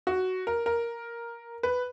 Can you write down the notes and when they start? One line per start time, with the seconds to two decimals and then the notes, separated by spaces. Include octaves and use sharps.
0.07 F#4
0.47 A#4
0.66 A#4
1.63 B4